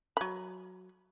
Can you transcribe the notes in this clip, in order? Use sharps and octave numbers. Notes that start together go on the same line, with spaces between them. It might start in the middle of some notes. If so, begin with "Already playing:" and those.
F#3 B5